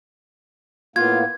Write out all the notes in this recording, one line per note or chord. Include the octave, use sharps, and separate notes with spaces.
A2 A#3 B3 F4 G#6